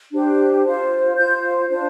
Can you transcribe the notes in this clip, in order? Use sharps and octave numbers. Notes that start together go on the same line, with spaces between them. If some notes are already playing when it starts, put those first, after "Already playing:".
D4 G4 C5
F4 C5
F4 C5 G6
D4 F4 C5